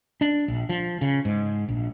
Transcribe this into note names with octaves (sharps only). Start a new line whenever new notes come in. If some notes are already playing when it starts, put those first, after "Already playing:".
D4
A#1
F3
C#3
G#2
A#1